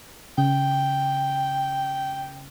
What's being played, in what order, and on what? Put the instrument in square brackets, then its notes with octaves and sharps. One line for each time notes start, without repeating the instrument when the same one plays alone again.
[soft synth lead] C#3 [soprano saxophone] G5